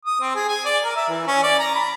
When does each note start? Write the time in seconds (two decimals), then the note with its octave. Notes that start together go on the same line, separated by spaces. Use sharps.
0.05 D#6
0.21 C4
0.35 G#4
0.48 G#5
0.65 D5
0.84 A#4
0.96 E5
1.09 E3
1.27 C#4
1.43 D5
1.59 A#5
1.75 B5